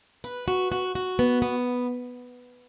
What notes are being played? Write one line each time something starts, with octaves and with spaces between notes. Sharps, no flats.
B4
F#4
F#4
F#4
B3
B3